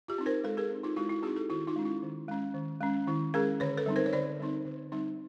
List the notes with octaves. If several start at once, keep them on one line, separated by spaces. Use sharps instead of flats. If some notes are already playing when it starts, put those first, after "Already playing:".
F4 G4
C4 D#4
A#4 C5
G#3 A4 B4
G#4 A#4
C4 D#4
D#4 F4
G#3 E4 F#4
E4 F#4
C4 D#4 F#4 G#4
G4 A4
D#3 E4 F#4
D#4 F4
G#3 C#4
E4
D#3
G#3 C#4
D#3
G#3 C#4
D#3 E4
G#3 C#4 G#4 A#4
D3 B4 C#5
A4 B4
G3 C4 D#4
A#4 C5
C#5
D3 C5 D5
G3 C4 D#4
D3
G3 C4 D#4